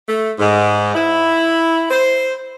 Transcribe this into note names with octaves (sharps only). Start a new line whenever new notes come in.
A3
G#2
E4
C5